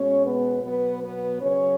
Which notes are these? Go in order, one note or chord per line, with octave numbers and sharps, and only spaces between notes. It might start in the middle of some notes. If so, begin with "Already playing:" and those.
Already playing: B2 G#3 C#4 C#5
B3 B4
B2 F#3 B3 B4
B3 B4
C#3 F#3 C#4 C#5